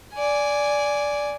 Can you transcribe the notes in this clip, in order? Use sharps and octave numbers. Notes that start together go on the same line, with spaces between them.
D5 G#5